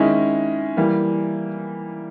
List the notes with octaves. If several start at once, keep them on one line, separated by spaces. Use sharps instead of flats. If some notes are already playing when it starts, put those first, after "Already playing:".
Already playing: D#3 G#3 C#4 E4
E3 G3 A#3